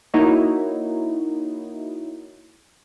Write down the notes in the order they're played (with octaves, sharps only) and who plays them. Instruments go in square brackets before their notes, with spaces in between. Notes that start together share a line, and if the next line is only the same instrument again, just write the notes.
[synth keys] A#3 D#4 E4 F#4 C#5